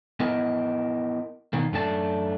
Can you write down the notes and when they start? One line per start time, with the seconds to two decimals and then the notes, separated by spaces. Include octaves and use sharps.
0.20 B3 E4 A#4 D#5
1.53 B2 D#3 A#3
1.72 F#2 A3 D4 G4 A5